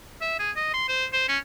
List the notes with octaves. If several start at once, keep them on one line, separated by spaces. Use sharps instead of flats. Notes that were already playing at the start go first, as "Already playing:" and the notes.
E5
G#4
D#5
C6
C5
C5
C#4